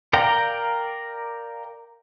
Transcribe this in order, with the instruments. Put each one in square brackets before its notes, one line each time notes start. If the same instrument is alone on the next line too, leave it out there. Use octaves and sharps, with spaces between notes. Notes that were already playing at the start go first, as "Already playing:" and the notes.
[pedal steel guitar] A#4 D5 F5 G5 A#5